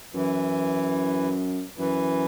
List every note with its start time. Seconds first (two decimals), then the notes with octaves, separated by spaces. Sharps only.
0.14 F#2 E3
1.78 F#2 E3